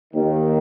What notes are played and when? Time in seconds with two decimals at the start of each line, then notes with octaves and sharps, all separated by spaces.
0.14 D#2 D#3